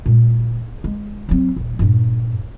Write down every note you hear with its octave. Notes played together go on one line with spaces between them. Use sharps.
A#2 G#3
G#3
F#3 C4
D#1
G2 A#2